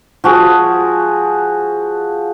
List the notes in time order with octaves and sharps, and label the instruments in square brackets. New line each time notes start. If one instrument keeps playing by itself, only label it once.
[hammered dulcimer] F3 F#4 G#4